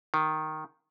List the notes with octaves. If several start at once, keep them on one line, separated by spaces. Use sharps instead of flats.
D#3